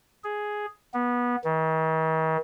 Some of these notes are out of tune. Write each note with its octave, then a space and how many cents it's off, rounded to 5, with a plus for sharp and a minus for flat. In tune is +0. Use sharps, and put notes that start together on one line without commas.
G#4 +5
B3 -20
D#3 +45